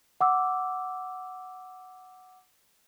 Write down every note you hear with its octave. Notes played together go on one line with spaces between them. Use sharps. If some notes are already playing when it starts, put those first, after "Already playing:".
F#5 D6 E6